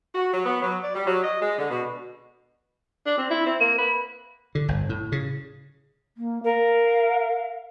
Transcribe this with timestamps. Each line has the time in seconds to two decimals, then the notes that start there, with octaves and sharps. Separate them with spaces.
0.14 F#4
0.33 F#3
0.45 B3
0.62 F#3
0.83 D5
0.95 G3
1.07 F#3
1.24 D#5
1.40 G#3
1.57 D3
1.70 B2
3.06 D4
3.18 C4
3.30 E4
3.46 C4
3.60 A#3
3.78 B4
4.55 D3
4.68 G1
4.89 A2
5.12 C#3
6.17 A#3
6.44 A#4 F5